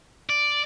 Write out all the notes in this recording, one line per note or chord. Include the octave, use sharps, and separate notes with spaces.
D5